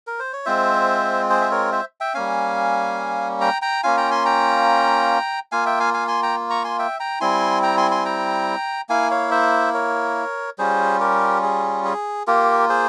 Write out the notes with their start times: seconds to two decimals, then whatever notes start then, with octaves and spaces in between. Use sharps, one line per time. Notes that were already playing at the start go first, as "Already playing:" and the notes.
0.07 A#4
0.19 C5
0.33 C#5
0.46 G#3 C4 F4 C5 E5
1.30 G#4 C5
1.41 E5
1.51 A#4 C#5
1.72 C5 E5
2.00 E5 G5
2.14 G3 A#3 C#4 F5 G#5
3.41 G5 A#5
3.62 G5 A#5
3.83 A#3 C#4 F4 F5 G#5
3.97 G5 A#5
4.11 G#5 C6
4.25 G5 A#5
5.52 A#3 F4 F5 G#5
5.66 E5 G5
5.80 F5 G#5
5.94 F5 G#5
6.08 G#5 C6
6.23 G5 A#5
6.50 A#5 C#6
6.64 G#5 C6
6.79 E5 G5
7.00 G5 A#5
7.20 G3 C4 E4 G#5 C6
7.63 G5 A#5
7.77 G#5 C6
7.91 G#5 C6
8.05 G5 A#5
8.89 A#3 E4 F5 G#5
9.11 C#5 F5
9.31 C5 E5
9.74 A#4 C#5
10.58 G3 C#4 F4 G#4 C5
11.00 G4 A#4
11.42 G#4
11.85 G#4
12.27 A#3 F4 G4 A#4
12.69 G#4 C5